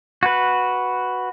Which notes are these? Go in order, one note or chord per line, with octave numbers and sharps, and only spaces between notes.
F#4 B4